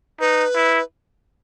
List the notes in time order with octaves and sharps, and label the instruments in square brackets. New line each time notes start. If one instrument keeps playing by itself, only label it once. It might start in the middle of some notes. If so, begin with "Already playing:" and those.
[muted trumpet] D#4 [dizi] B4
[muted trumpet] E4